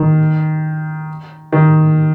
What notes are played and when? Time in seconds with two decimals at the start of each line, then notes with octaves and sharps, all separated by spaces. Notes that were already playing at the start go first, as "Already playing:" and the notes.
Already playing: D#3
1.52 D#3